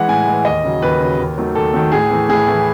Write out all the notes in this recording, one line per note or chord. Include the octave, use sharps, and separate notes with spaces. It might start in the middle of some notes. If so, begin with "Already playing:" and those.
Already playing: E3 G#3 F#5
A2 G#5
E3 G#3
D#2 D#5
C#3 F#3
D#2 B4
C#3 F#3
D#2
D#3 F#3 A3
D#2 A4
D#3 F#3 A3
A2 G#4
E3 A3
A2 G#4
E3 A3